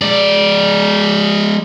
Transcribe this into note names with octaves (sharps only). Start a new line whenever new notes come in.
G#3 D5